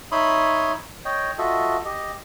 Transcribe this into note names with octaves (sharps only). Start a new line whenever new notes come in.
D#4 C#5 E5 B5 C6 D#6
C#5 D#5 G5
F4 F#4 A4 D#5 E5
G4 D#5